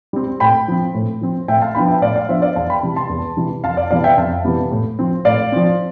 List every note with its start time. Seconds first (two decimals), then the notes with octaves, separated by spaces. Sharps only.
0.13 G3 C4
0.40 A2 G5 B5
0.68 F3 C4
0.95 A2
1.21 F3 C4
1.48 A2 E5 G5
1.62 F5 A5
1.75 F3 B3 D4 G5 B5
1.88 E5 G5
2.02 A2 D5 F5
2.16 D5 F5
2.29 F3 B3 D4 C5 E5
2.42 D5 F5
2.56 E2 F5 A5
2.70 G5 B5
2.83 C3 E3 G3
2.96 A5 C6
3.10 E2
3.37 C3 E3 G3
3.64 F2 F5 A5
3.77 D5 F5
3.91 C3 E3 G3 B3 D5 F5
4.04 E5 G5
4.17 F2 F5 A5
4.44 C3 E3 G3 B3
4.71 A2
4.99 F3 C4
5.25 A2 D5 F5
5.52 F3 C4